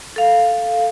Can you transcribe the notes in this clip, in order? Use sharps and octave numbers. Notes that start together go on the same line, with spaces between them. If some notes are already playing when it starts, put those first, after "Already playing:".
A4 F5